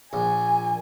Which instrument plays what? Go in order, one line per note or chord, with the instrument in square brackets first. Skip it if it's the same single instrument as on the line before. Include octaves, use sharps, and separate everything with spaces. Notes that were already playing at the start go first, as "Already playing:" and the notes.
[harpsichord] A#1 [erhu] G#5